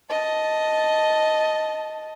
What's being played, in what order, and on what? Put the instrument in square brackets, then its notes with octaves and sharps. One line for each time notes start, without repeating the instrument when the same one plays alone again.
[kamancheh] D#5 A5